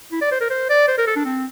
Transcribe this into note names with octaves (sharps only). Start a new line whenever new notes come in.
E4
D5
C5
A#4
C5
D5
C5
A#4
A4
D4
C4